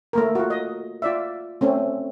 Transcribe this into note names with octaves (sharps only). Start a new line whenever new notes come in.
A3 A#3 A#4
F4 F#4
D#5
F4 D5 E5
A3 C4 C#4